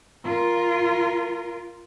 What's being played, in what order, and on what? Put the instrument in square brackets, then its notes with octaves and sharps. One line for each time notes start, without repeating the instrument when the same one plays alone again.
[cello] F4 A#4